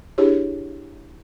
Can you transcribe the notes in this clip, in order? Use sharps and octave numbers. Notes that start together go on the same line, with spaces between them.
D4 E4 G4 G#4 C#5